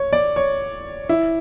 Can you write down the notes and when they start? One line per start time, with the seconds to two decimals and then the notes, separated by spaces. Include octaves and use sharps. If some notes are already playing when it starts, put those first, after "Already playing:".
Already playing: C#5
0.13 D5
0.36 C#5
1.09 E4